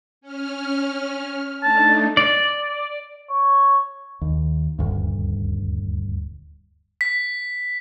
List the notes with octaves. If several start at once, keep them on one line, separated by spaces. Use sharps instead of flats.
C#4 F6
A3 D4 D#4 A5
D5
C#5
D#2
D#1 D2 G2
B6